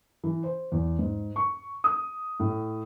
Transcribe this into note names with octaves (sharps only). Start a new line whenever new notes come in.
E3
C5
E2
G#2
C#6
D#6
A2